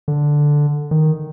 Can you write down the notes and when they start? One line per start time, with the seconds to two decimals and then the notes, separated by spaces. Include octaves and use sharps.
0.08 D3
0.91 D#3